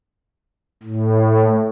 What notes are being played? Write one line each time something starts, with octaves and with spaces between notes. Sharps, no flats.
A2